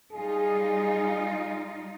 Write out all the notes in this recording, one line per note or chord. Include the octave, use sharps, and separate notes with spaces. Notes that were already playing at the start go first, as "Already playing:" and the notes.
G3 D#4 F4 G#4